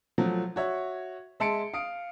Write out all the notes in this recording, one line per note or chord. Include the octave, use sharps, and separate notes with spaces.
F3 F#3 A3
F#4 C#5 E5
G#3 E5 A5 C6 C#7 D7
F5 D#6 D7